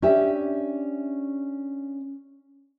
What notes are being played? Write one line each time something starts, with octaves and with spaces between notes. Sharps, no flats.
C#4 D4 G4 E5